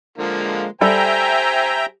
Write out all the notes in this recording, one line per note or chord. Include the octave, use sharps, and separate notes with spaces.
D3 F3 G#3 A#3
G3 A4 C5 E5 G5 G#5 A#5 B5